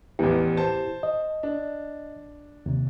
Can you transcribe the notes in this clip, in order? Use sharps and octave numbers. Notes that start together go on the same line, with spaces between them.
A1 E2 E4 G4
C5 A5
D#5
D4
D#2 C3